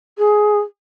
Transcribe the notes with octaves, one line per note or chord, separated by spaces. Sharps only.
G#4